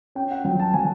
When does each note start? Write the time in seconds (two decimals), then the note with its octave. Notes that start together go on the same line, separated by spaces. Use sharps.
0.15 C#4 G5
0.31 F#5
0.45 F#3 G5
0.59 A5
0.74 F#3 G#5